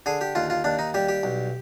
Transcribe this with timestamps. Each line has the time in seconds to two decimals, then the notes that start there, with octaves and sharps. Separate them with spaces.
0.06 D3 G#4
0.21 G4
0.35 D#2 F4
0.50 F4
0.64 D#2 D4
0.79 D#4
0.94 G3 G4
1.09 G4
1.23 B1